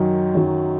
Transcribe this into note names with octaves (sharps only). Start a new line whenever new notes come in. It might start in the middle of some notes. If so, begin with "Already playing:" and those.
Already playing: F#2 D#3 F#3
F#2 D#3 F#3